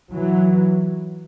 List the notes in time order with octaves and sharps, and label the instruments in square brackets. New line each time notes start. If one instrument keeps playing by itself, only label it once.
[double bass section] E3 F#3